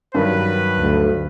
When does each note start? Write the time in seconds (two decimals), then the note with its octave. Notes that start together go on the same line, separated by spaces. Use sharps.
0.15 G2 D#3 F#3 B4
0.79 D2